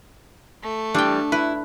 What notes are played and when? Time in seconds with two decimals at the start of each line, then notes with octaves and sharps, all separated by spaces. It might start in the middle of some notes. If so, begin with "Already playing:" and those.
0.63 A3
0.94 E3 G3 D4 G5
1.32 E4 B4